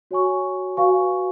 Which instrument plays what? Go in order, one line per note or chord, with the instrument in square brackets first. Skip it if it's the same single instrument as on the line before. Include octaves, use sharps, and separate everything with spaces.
[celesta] F#4 C#5 G#5 C#6
F#4 B4 F5 G#5 C#6